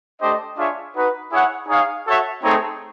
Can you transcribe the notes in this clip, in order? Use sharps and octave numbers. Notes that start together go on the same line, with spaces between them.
A3 D4 G4 C5 D#5
D4 F4 G#4 C#5 E5
D#4 F#4 B4
E4 G#4 C#5 F#5
D#4 G#4 C#5 F5
F#4 A4 C#5 E5
A3 C4 D#4 G#4 C#5